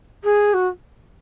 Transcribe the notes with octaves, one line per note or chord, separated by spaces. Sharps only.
G#4
F#4